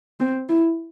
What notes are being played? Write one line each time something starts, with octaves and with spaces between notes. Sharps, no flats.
C4
E4